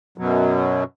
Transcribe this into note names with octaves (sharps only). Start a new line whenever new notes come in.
F#2 B2 F#3